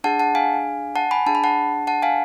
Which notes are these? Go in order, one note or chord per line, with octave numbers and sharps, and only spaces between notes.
D4 G#4 F#5 A5
F#5 A5
F5 G#5
F#5 A5
G#5 B5
D4 G#4 A5
B5
F#5 A5
F#5 A5
F5 G#5